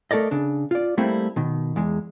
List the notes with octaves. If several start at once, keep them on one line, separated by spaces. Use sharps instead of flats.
A3 A4 A#4 D5 D#5
C#3 D4
F4 D5
G3 A3 A#3 C4 E4
B2 D#3
E2 G#3